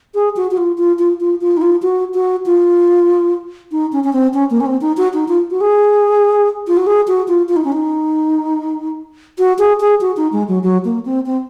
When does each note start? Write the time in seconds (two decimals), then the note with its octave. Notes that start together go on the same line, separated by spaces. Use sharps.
0.14 G#4
0.36 F#4
0.51 F#4
0.57 F4
0.78 F4
0.99 F4
1.20 F4
1.41 F4
1.57 D#4
1.61 F4
1.82 F#4
2.14 F#4
2.46 F4
3.72 D#4
3.92 C#4
4.04 C#4
4.13 C4
4.34 C#4
4.50 A#3
4.60 C#4
4.66 C4
4.81 D#4
4.97 F#4
5.14 D#4
5.28 F4
5.51 F#4
5.61 G#4
6.67 F4
6.77 F#4
6.86 G#4
7.07 F#4
7.28 F4
7.49 F4
7.56 D#4
7.64 C#4
7.72 D#4
9.38 F#4
9.58 G#4
9.80 G#4
10.01 F#4
10.17 D#4
10.32 G#3
10.48 F#3
10.63 F#3
10.84 A#3
11.05 C4
11.26 C4